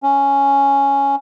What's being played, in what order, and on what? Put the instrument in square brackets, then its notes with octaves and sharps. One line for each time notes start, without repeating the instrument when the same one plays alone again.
[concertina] C#4